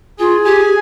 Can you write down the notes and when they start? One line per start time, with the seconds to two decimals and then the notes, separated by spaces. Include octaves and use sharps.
0.19 F4 G#4
0.45 G4 G#5